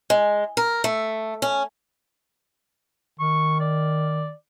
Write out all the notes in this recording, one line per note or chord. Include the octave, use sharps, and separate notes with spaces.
G#3
A#4
A3
C#4
D#3 C#6
D5